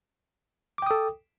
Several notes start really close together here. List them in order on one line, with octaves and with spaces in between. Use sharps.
D6 G5 D#6 A4